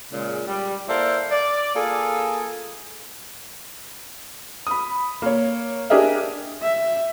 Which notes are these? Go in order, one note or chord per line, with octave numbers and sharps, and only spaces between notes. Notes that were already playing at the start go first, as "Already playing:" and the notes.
A#2 C#3 G#3
G3
A#3 E4 A4 C5 D5
D5
A#3 F4 G#4 A4
B5 D#6
A#3 C#5
D4 G4 G#4 A#4 D#5 E5
E5